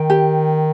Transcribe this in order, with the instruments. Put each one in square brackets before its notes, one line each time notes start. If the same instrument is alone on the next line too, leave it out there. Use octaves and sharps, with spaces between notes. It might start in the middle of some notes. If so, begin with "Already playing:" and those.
Already playing: [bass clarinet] D#3 [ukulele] G5
[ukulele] G4